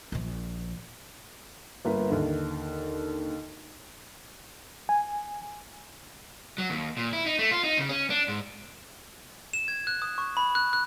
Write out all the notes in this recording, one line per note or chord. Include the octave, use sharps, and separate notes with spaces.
A#1 F3
G1 A#3 B4
D#2 D3
G#5
F#3
D#2
A#2
E4
D#4
A3
F4
D#4
C#3
C#4
D4
G#2
E7
G#6
F#6
D#6
C#6
B5
F#6
F#6